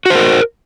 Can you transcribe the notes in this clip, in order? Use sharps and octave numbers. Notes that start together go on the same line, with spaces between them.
F#4 A#4 C5